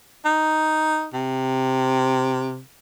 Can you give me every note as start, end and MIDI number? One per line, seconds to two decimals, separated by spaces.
0.25 1.07 63
1.14 2.60 48